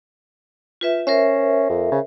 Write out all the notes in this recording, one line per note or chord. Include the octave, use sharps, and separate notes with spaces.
F4 B4 E5
C#4 A#4 C5 E5
F2
C#3